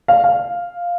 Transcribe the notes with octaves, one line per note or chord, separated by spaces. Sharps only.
F5
F5